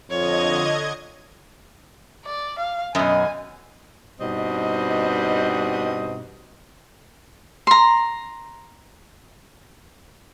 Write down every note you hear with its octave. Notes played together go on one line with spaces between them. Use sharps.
F2 D3 F4 C#5 D#5 G#6
D5
F5
F#2 B2 D#3 D#5 G#5
G2 B2 G3 C4 D#4 D#5
A#5 C6